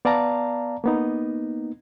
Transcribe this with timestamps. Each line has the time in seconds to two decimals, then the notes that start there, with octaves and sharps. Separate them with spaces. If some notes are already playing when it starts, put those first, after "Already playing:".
0.05 B3 D5 F5 A5 A#5
0.84 A#3 B3 D#4